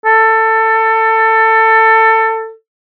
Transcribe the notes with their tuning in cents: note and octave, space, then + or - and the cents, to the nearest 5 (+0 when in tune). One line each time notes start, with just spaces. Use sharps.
A4 +20